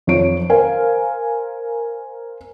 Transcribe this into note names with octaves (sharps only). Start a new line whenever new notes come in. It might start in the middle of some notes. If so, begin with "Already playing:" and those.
F2 F4 C#5 D7
A#4 C5 F5 G#5